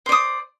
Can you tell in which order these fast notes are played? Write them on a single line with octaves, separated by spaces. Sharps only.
C5 D5 D#6